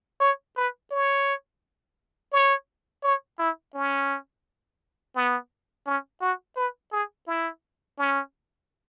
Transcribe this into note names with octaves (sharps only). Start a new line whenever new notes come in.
C#5
B4
C#5
C#5
C#5
E4
C#4
B3
C#4
F#4
B4
G#4
E4
C#4